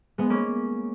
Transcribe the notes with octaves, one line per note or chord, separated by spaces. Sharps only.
G#3 B3
A#3 C#4